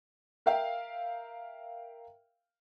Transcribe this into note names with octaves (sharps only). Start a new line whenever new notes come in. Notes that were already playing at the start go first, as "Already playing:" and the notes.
A#4 E5 F5 G5